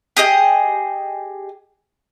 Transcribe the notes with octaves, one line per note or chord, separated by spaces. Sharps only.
G4 G#4 D#5